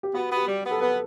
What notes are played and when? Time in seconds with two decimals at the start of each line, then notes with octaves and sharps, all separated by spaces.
0.03 G4
0.14 B3 F#4
0.31 B3
0.36 G4
0.47 G3
0.64 B3
0.71 A4
0.81 B3 B4